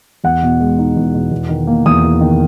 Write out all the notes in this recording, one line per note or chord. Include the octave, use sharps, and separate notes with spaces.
E2 F#5
B2
G#3
D#4
E2
B2
E2
D#3
A#3
E2 D#6
E2
D#3